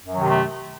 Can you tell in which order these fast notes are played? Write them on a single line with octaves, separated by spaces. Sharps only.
F#2 F#3 D#3 C3 A3